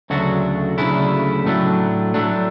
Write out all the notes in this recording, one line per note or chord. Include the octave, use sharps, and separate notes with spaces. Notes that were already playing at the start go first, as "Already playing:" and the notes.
D2 C#3 F#3 A3 D4 F#4
D2 C#3 F#3 A3 D4 E4
A2 F#3 A3 D4
A2 F#3 A3 D4